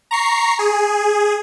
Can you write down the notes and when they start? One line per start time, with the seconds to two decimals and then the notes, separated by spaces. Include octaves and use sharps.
0.11 A#5 C#6 C7
0.59 G#4